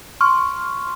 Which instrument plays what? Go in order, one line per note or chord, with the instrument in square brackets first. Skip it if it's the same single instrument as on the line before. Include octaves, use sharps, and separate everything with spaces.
[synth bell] C6 C#6 F6